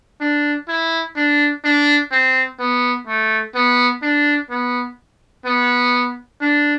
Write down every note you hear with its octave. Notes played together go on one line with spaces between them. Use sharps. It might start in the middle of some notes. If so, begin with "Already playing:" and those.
D4
E4
D4
D4
C4
B3
A3
B3
D4
B3
B3
D4